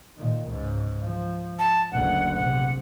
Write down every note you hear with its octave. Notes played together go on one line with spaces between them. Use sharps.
A#2 D#3
C#2 G#2
F3
A5
F#1 D2 F#5
A#1 C3 F#5